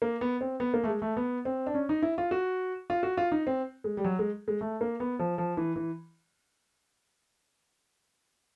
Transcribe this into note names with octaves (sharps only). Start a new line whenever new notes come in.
A#3
B3
C4
B3
A#3
A3
G#3
A3
B3
C4
D4
C#4
D#4
E4
F4
F#4
F4
F#4
F4
D#4
C4
G#3
G3
F#3
G#3
G#3
A3
A#3
B3
F3
F3
E3
E3